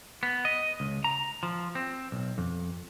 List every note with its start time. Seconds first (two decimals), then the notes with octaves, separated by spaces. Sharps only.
0.23 B3
0.45 D#5
0.80 C#2
1.04 A#5
1.43 F3
1.75 C4
2.12 B1
2.38 F2